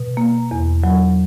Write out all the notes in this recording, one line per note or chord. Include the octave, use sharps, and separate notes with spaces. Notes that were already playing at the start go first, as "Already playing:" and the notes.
Already playing: B2
A#3
E2
F#3